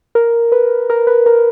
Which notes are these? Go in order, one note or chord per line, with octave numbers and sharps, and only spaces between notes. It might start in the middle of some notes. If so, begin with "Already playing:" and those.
A#4
B4
A#4
B4
A#4